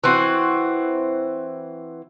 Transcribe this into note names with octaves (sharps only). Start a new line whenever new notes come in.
E3 C4 F#4